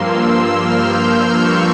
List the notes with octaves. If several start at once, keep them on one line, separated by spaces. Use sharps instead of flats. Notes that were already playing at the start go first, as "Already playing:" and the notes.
Already playing: G2 F3 A#3 C6 E6
E6
F6
G6
E6
C#6